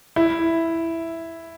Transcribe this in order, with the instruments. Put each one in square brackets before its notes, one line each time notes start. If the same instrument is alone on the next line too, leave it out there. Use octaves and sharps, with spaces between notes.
[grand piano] E4